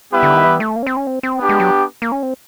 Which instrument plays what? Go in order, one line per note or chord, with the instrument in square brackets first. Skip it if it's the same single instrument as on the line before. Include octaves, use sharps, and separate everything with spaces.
[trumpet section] G3 B3 E4 G4 B4
[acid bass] D3
D#3
E3
A3
A#3
C#4
C4
C#4
C4
C4
[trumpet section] B3 D4 G4
[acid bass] G#3
F#3
A#3
C#4
C4